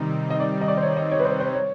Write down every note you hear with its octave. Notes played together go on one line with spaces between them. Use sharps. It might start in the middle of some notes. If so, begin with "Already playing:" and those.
Already playing: C3 D#3 G3 C4 D#4 D#5
D#5
D5
D#5
D5
C5
C#5
D#5
C#5
B4
C5
C5
C#5